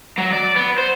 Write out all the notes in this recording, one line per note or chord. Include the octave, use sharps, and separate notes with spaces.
F#3
D5
B3
C5